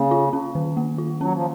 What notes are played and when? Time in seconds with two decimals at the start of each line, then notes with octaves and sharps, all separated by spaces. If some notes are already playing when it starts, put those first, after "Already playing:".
Already playing: C#3 A#3
0.11 F4
0.33 C#4
0.55 D#3
0.77 A#3
0.98 F4
1.20 F#3 C#4
1.33 F3